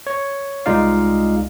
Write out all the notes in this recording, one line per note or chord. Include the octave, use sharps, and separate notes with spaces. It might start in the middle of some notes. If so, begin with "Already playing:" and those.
C#5
C2 G#3 D#4 F4 D5 F5